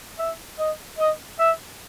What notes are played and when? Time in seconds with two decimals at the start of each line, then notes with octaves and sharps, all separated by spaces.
0.18 E5
0.59 D#5
0.98 D#5
1.39 E5